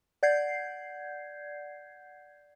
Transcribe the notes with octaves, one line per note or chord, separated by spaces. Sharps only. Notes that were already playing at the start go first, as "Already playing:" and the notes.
D5 F#5 G6 G#6 C7